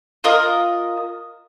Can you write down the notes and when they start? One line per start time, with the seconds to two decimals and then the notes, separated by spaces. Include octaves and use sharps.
0.24 F4 A#4 D#5